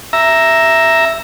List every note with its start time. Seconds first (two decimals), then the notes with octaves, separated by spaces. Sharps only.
0.13 E5 A#5